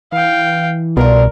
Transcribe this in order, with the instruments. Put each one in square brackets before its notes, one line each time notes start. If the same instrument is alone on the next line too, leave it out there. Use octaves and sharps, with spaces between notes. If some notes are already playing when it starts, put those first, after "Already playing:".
[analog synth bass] E3 [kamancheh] F5 G5
[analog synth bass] C2 [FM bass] B2 [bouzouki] D4 E4 F4 [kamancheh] A#4